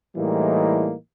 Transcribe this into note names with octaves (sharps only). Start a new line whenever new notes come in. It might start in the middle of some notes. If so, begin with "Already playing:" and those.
A2 E3 G3 G#3 A#3 D#4